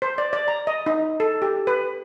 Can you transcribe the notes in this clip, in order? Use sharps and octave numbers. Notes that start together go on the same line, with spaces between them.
C5
D5
D5
A#5
D#5
D#4
A4
G4
B4